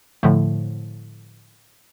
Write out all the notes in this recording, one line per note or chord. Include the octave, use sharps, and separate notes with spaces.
A2 D3 F3 A3